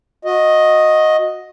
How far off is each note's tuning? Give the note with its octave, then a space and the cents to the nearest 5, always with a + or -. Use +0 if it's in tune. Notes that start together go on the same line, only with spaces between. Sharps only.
F#4 -25 D#5 +5